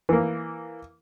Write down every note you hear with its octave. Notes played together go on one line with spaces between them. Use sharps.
E3 A#3